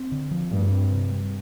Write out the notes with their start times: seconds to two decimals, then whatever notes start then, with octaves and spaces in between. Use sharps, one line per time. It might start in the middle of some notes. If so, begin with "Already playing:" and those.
Already playing: C4
0.12 D3
0.31 F3
0.52 G2 A3
0.72 C4
0.92 C3
1.11 G3